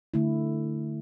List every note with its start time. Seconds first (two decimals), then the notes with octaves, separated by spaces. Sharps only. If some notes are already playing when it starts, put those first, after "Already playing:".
0.14 D3 A3 E4